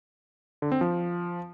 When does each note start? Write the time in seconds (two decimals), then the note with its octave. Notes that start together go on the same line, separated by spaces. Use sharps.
0.62 D3
0.72 C4
0.81 F3